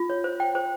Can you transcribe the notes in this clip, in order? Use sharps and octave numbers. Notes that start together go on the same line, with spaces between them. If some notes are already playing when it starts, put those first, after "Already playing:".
Already playing: F4
C#5
C5
G5
C5